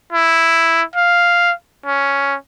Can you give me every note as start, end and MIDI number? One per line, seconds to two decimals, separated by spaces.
0.12 0.82 64
0.96 1.52 77
1.86 2.35 61